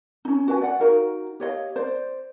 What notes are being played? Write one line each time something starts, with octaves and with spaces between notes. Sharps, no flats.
C#4 D#4
F#4 B4 F5 G#5
D5 F#5
D#4 F#4 A#4 F5
G4 C#5 D#5 F5
C5 D5